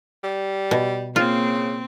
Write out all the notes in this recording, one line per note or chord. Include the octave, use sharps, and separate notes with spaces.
G3
B2
C#3 A#3 C4 F4